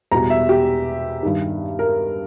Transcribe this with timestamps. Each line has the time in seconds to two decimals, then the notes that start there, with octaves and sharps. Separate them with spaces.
0.11 E2 B2 G3 A#5
0.30 E5
0.49 G4
1.23 G2 D#3 G3
1.79 A#4